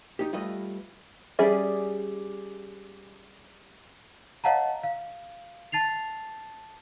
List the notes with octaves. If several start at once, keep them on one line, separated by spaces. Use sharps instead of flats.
D#4 G4
G3 A3 F4 B4 D#5
G3 C#4 G#4 D5 E5
C#5 D#5 F5 F#5 A5 A#5
F5
A5 A6 C7 F7